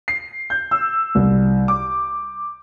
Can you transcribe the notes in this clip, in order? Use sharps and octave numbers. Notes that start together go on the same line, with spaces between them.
C7
G6
E6
C2
D6